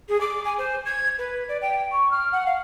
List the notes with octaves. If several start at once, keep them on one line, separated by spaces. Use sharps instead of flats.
G#4
D6
G#5
C5
G#6
B4
D5
G5
C#6
F6
F#5
F5